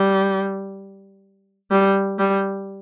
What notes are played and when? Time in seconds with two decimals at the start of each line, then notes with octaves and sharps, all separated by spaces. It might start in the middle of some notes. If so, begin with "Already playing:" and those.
Already playing: G3
1.71 G3
2.19 G3